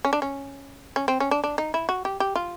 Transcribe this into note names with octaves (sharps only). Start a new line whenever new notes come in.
C#4
D4
C#4
C#4
C4
C#4
D4
D4
D#4
E4
F#4
G4
G4
F4